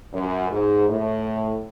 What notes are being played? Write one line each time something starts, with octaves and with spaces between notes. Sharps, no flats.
F#2
G#2
A2